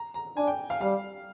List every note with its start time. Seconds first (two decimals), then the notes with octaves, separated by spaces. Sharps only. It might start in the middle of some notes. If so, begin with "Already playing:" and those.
Already playing: A#5
0.14 A#5
0.37 D4 G#5
0.47 G5
0.70 F5
0.81 G3 F5